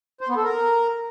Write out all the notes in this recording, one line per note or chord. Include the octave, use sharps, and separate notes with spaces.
C5
B3
A4
A#4